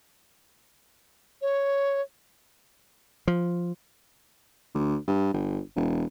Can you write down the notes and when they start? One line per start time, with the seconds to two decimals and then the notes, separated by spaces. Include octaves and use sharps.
1.42 C#5
3.27 F3
4.74 D2
5.08 G2
5.34 G1
5.76 E1